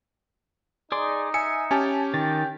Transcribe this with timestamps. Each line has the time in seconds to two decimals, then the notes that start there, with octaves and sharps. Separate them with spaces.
0.92 D#4 G#4 D5 C6
1.34 E5 G#5 C#7
1.71 C#4 G4 G#5 A5
2.14 D#3 G5 A6